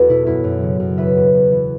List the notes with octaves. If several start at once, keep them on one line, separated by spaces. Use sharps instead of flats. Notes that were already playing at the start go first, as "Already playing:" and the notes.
Already playing: E2 E3 F#4 A4 B4
B2 E4
F#2 E4
F#2
C#3
F#2
E2 B4 E5
E2
E2
E3